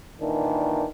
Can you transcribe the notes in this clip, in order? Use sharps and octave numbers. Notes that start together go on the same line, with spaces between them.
A#2 D#3 E3 D4